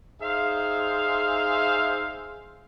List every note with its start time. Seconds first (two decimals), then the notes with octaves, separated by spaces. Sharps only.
0.21 D#4 G#4 C5 E5 F5 C6